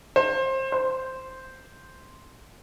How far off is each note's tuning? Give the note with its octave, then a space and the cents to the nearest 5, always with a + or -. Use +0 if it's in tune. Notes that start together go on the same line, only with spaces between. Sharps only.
C5 +25
C5 -5